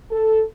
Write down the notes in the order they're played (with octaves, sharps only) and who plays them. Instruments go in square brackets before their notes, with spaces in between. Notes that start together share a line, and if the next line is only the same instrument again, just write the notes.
[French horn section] A4